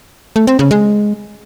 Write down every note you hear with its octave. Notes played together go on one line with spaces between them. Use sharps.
A3
C4
C#3
G#3